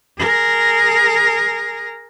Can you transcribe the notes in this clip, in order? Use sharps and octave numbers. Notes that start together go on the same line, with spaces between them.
G#4 A#4